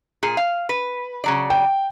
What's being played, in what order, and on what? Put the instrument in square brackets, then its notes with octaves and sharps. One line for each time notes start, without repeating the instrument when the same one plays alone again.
[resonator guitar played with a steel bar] A#2 G#4
F5
B4
C#3 F#3 D5
[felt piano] G5